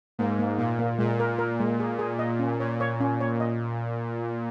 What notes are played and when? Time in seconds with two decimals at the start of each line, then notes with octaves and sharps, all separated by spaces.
0.19 G#2 A#3
0.39 A#3
0.59 A#2 A#3
0.79 A#3
0.99 A#2 G#3
1.20 A#4
1.39 A#4
1.60 G#3
1.80 G#4
1.99 G#4
2.19 D#5
2.39 C#4
2.60 A#2 C#5
2.80 C#5
3.00 C#4
3.21 C#5
3.40 D#5